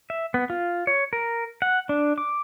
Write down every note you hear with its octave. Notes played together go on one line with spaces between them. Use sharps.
E5
B3
F4
C#5
A#4
F#5
D4
D6